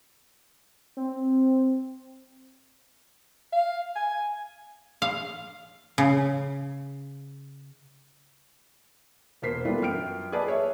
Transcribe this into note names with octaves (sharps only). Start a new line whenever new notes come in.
C4
F5
G#5
F5
C#3
E1 A#3 A#4 C5 B6 C7
E3 G3 B3 D4 F4 A4
F#2 G5 F6 D7
G#4 B4 D5 D#5 A5
G#4 C#5 E5